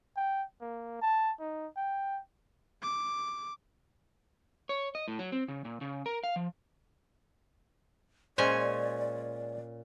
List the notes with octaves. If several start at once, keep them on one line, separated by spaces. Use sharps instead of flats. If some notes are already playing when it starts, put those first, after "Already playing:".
G5
A#3
A5
D#4
G5
D6
C#5
D#5
A2
F#3
C4
C#3
A#2
C#3
A#4
F5
F3
A#2 G#3 C#4 C5 D5 G#5